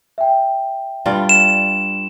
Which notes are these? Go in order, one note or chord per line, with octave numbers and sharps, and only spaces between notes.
E5 G5
G2 G3 F4
E7